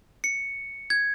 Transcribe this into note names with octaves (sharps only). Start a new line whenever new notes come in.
C#7
G#6